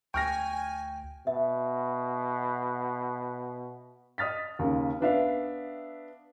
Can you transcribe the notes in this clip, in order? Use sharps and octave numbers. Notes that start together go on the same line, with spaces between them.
D2 G5 G#5 C#6 F6 A#6
B2 E5
D#5 D#6 F6 A6 B6
D#2 C#3
B3 D4 E5 F5